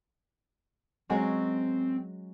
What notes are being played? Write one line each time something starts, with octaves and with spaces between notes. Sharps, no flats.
F#3 G#3 C4 C#4